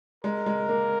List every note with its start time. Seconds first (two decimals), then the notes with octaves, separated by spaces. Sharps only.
0.24 G#3 A#4
0.46 G#3
0.69 A#3